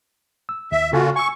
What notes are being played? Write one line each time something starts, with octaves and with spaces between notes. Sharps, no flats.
E6
D#2 E5
A#2 C#3 F4 F#4 A4 G#5
G#5 C#6 E6